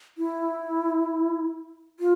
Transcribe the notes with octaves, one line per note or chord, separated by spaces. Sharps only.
E4
F4